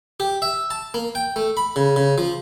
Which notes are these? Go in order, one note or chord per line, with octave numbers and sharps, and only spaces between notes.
G4
E5
A5
A#3
G5
A3
B5
C#3
C#3
F3